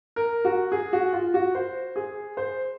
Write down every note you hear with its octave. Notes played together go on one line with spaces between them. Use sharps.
A#4
F#4
G#4
F#4
F4
F#4
C5
G#4
C5